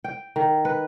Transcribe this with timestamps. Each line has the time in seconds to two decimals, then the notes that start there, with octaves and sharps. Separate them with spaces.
0.04 G5
0.36 D#3
0.65 B4